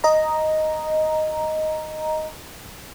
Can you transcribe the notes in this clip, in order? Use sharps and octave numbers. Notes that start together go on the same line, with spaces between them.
D#5 A#5